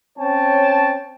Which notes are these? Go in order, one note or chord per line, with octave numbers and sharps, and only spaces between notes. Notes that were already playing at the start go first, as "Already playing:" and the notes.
C4 C#4 C#5 G5 A5